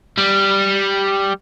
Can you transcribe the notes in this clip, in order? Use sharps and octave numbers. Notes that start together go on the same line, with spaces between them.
G3